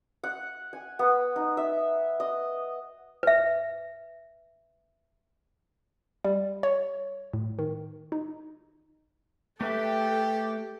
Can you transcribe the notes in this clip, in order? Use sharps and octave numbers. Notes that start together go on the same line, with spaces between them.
F#5
G#5
B3
D#4
E5
D#5
B4 E5
G3
C#5
A2
D#3
D#4
A3 G4 A4 B4 E5